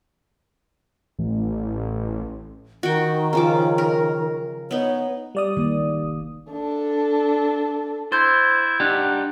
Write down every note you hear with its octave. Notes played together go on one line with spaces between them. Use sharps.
A1
D#3 F#4 G5
C#3 F3 D6
A#4
B3 D#4 C#5
G3 D5 D#6
A#1 D#3 A#3
F1
D4 A4
E4 C5 C6 G6 A6
D4 D#4 G4 F#5